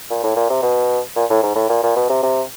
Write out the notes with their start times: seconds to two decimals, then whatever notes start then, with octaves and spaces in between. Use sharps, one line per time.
0.10 A#2
0.24 A2
0.36 A#2
0.50 C3
0.63 B2
1.16 A#2
1.30 A2
1.43 G#2
1.56 A2
1.69 A#2
1.83 A#2
1.96 B2
2.10 C3
2.23 C3